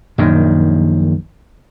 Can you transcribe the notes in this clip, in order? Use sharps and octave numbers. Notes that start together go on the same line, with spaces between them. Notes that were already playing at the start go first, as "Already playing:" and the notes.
A#1 F#2 D#3